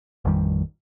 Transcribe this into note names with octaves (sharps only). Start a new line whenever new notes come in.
A1 F2 D#3 G3